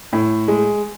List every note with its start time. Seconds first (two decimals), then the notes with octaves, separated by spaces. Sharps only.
0.13 A2
0.48 G#3